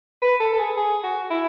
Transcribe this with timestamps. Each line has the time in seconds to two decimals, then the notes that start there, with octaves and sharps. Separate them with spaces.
0.22 B4
0.40 A4
0.53 A4
0.59 G#4
0.76 G#4
1.04 F#4
1.31 E4